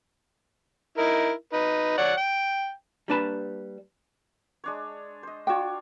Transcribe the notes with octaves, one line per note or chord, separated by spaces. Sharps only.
D#4 E4 A#4
D#4 B4
C#5 D5 F#5
G5
G3 A#3 D4 B4 A5 B5
G#3 D4 C#5
C5 D#5
D4 F4 F#4 C#5 G5